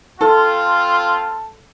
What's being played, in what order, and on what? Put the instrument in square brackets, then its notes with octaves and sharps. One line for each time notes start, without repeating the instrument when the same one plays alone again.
[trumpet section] C4 F4 [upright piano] A4